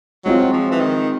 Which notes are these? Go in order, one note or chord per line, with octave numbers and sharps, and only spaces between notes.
F#3 G#3 C4 F4
F3
E3
D#3